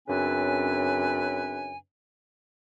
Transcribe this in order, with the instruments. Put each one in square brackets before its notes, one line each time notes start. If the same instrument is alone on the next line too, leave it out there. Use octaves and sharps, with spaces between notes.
[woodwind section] F#2 C#3 C4 D4 B4 G#5